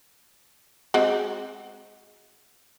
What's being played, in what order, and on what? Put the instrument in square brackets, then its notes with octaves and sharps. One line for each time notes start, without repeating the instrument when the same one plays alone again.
[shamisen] G#3 C4 F#4